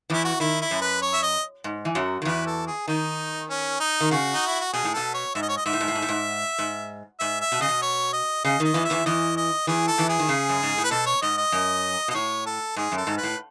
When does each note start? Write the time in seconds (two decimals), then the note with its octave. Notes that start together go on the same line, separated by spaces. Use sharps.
0.10 E2 E3 E4
0.25 F#4
0.40 D#3 E4
0.62 E4
0.71 F#2
0.81 B4
1.02 C#5
1.14 E5
1.23 D#5
1.64 G#2
1.85 E3
1.95 F#2 F#3
2.22 D#3
2.25 E2 E3 B4
2.47 A4
2.67 G#4
2.88 D#3 D#4
3.50 C#4
3.80 D#4
4.01 D#3
4.11 C#3 F#4
4.34 D#4
4.47 E4
4.60 F#4
4.73 B2 G#4
4.84 A2
4.94 B2 A4
5.14 C#5
5.35 G#2 E5
5.42 D#5
5.49 C#5
5.57 D#5
5.66 G#2 E5
5.73 A2
5.81 G#2
5.88 A2
5.95 G#2
6.02 A2
6.09 G#2
6.58 G#2
7.20 G#2 E5
7.41 E5
7.52 B2
7.61 C#3 D#5
7.69 B2
7.82 C#5
8.13 D#5
8.44 C#3 D#5
8.60 D#3 D#5
8.74 E2 E3
8.85 E5
8.90 E2 E3
9.06 E2 E3 D#5
9.37 D#5
9.67 E2 E3 G#4
9.87 A4
9.98 E2 E3
10.09 G#4
10.19 D#3
10.29 C#3
10.49 F#2
10.63 G#2
10.78 A2
10.84 B4
10.91 B2 A4
11.06 C#5
11.22 G#2 D#5
11.37 D#5
11.52 F#2
12.08 B2 D#5
12.15 A2 C#5
12.46 A4
12.76 G#2 G#4
12.92 F#2
12.97 A4
13.07 G#2
13.17 B4
13.23 A2